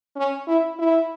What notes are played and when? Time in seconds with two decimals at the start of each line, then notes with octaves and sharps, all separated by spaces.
0.16 C#4
0.47 E4
0.79 E4